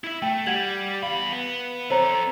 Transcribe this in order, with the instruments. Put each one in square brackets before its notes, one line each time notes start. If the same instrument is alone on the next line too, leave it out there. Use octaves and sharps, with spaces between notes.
[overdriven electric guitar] E4 E5
[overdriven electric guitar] A3 [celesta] G5
[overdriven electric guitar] G3 [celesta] F#5 G#6 F#7
[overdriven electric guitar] E2 B5 [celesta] F5
[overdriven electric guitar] B3
[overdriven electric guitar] C4 A4 [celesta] C5 C#5 A#5